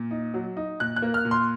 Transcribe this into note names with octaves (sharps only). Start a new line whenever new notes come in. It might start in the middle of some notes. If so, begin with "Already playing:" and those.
Already playing: A#2
D#4
F#3
D#4
A#2 F#6
F#6
A#3
F6
A#2
C6